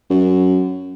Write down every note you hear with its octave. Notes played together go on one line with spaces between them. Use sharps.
F#2